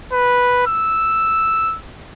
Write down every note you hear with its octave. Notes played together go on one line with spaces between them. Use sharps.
B4
E6